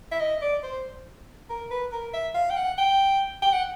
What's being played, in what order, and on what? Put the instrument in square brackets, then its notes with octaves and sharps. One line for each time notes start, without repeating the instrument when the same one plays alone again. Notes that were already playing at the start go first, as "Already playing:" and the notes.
[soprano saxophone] E5
D#5
D5
C5
A#4
B4
A#4
E5
F5
G5
F#5
G5
G5
F#5